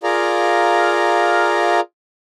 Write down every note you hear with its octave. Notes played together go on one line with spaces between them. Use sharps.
F4 G#4 A#4 D5 F5 A#5